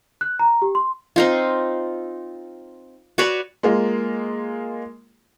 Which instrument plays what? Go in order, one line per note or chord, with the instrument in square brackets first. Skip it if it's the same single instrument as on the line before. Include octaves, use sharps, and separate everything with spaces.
[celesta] F#6
A#5
G4
C6
[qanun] C4 D#4 F4
F#4 B4 C#5 D5
[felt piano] G#3 A#3 F4